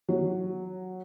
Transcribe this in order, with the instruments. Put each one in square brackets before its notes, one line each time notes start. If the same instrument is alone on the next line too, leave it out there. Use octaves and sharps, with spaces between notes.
[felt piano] F#3